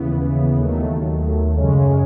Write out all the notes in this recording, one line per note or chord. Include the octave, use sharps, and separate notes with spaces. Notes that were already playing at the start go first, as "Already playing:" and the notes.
Already playing: D#2 C#3 E3 B3
D#2 D#3 F#3 A3
F#2 C#3 G#3 C#4